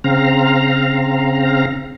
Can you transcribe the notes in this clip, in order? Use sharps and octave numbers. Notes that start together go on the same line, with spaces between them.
C#3 C4 F5 A#5